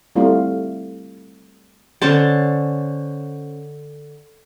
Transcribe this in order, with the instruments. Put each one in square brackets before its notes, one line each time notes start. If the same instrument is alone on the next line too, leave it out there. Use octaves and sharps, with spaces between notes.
[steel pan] G3 A3 C4 E4 F4
[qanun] D3 C#4 C5 A5